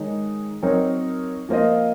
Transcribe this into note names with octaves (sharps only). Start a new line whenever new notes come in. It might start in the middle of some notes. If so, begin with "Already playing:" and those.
Already playing: D#3 G#3 D#4 C#5
F#3 C4 D#4 A#4 C#5
F3 A#3 F4 C5 D#5